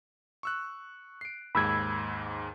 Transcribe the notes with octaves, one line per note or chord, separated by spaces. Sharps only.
C#6 E6 F#6
C7 D7
D#2 G#2 B5 E6 G#6